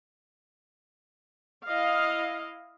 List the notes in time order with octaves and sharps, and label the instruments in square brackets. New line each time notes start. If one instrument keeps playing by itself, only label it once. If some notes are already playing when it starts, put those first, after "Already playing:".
[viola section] E4 D#5 F5